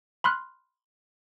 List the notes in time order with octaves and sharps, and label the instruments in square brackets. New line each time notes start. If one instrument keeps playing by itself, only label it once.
[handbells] B5 C6 F6 F#6